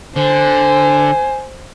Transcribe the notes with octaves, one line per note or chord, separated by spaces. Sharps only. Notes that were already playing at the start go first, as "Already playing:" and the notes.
D3 C5 G#5